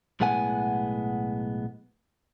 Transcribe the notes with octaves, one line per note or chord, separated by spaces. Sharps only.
B1 A2 G#3 B3 F#5 G#5